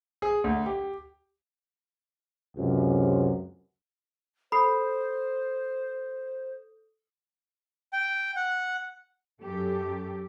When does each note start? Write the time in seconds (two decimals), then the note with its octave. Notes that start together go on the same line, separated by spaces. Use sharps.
0.22 G#4
0.44 D2
0.66 G4
2.57 C#2 F#2 C3
4.52 A4 C5 B5 D#6 C7
7.93 G5
8.36 F#5
9.42 F#2 G4 A4